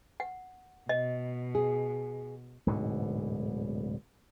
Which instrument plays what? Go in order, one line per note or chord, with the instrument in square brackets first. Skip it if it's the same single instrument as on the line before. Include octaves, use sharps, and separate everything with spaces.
[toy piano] F#5
[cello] B2 [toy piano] D#5
[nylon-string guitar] G#4
[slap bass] D1 G#2 B2 D3